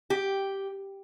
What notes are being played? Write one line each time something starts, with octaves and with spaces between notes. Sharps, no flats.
G4